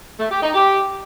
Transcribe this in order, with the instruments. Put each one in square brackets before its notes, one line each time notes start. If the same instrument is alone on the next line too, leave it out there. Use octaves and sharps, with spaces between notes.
[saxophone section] A3
G4
D#4
G4